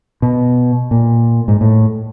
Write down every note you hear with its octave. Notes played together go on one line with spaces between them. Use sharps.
B2
A#2
G#2
A2